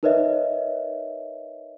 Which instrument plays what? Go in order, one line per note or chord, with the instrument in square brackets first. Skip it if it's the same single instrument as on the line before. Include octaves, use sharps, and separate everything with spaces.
[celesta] D#4 A#4 B4 C#5 D#5 E5